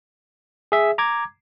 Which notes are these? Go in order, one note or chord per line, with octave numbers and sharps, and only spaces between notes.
G#4 E5
A#5 D6 G#6